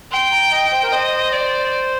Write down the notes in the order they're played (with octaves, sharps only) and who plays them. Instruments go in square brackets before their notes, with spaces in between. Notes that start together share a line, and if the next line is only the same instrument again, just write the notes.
[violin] G5 [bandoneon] C6
[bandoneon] A#5
D#5
C5
A#4
[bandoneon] C5 [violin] D#5
[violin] D5